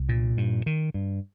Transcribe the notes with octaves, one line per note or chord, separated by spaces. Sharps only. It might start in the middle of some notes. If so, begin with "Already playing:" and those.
Already playing: C2
A#2
G2
D#3
G2